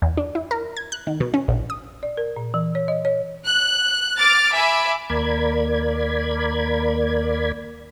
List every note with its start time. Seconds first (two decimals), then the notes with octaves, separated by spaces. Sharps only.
0.02 E2
0.17 D4
0.35 E4
0.51 A#4
0.77 G#6
0.92 F#6
1.07 D#3
1.20 B2
1.34 C#4
1.48 A#1
1.70 D#6
2.03 D5
2.17 A#4
2.36 A#2
2.54 E3
2.75 C#5
2.88 D#5
3.05 C#5
3.44 F#6
4.17 D6 F6 A6
4.53 E5 G#5 B5 D6
5.10 D#2 A#3 A#4 D5 B5 G#6